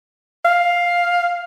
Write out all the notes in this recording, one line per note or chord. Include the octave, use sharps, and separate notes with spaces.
F5